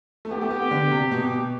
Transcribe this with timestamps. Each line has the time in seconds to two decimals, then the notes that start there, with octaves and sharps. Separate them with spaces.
0.25 A3
0.31 B3 G4
0.41 A3
0.50 B3
0.62 B3
0.71 D3
0.91 C3
1.11 B2